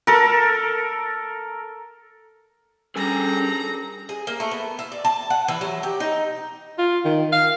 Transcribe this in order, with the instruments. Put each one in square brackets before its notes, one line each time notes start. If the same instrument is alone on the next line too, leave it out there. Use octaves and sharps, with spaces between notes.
[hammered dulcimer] A4 A#4
[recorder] G3 [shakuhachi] C#4 [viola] D4 A#5 [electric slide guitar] G#4 A4 G#5
[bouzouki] G#4
A#3
A3
B3
E4
D5
A5
F#5
E3
F#3
G4
D#4
[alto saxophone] F4
D#3
F5